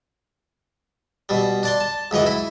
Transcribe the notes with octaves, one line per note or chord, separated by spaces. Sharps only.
B2 G3
D4 D5 C6
A5
C#2 F#2 E3 D#5
E4